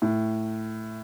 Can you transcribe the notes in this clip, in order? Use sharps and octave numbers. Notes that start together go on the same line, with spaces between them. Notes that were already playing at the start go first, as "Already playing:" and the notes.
A2